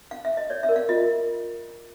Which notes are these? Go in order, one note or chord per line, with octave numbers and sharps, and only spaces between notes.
F5
E5
D#5
C#5 D5
E5
A#4
F5
F4 D#5